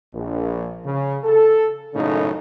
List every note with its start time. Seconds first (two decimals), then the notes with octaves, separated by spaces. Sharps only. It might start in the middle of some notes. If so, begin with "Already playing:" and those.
0.14 A#1
0.84 C#3
1.24 A4
1.94 G#1 F#2 A2 C#3 A3 D#4